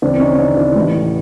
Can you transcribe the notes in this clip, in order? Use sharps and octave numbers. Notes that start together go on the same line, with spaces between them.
D2 C#3 E3 C4 D4
C#4 D#4
C#4 D#4
D4 E4
A1 A2 E3